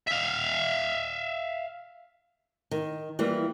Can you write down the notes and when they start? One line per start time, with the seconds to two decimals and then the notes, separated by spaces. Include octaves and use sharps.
0.07 E5 F5
2.71 D#3
3.19 E3 G3 A#3 F4